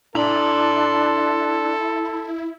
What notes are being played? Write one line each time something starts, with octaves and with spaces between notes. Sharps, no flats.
D4 E4 A4 A#5 C6